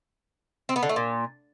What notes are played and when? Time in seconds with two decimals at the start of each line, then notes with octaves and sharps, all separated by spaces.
0.69 C4
0.76 B3
0.83 D3
0.89 A3
0.96 A#2